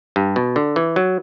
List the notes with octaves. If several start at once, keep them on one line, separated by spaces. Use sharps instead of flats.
G2
B2
D3
E3
F#3